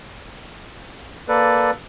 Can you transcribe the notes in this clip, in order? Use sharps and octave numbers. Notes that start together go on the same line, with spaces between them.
A#3 A4 B4 D5